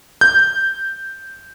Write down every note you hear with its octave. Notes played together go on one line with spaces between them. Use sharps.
G6